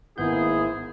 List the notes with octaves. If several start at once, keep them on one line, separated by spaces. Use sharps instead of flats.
G#1 G#2 A#3 B3 E4 G#4 G6